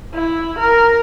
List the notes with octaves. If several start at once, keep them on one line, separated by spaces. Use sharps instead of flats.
E4
A#4